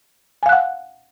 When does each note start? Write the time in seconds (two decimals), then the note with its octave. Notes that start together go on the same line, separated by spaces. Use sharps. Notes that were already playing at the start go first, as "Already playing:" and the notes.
0.43 G#5
0.46 F5
0.49 F#6
0.52 F#5